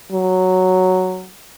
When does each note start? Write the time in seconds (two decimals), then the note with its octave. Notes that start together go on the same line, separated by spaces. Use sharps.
0.12 F#3